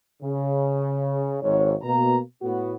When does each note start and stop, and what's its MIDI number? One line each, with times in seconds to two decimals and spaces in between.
0.22 1.37 49
1.42 1.74 32
1.42 1.74 44
1.42 1.74 73
1.83 2.19 47
1.83 2.19 58
1.83 2.19 82
2.42 2.75 45
2.42 2.75 59
2.42 2.75 66